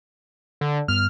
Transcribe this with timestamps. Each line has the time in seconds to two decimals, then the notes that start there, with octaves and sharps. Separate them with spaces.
0.61 D3
0.88 G2 B3 F6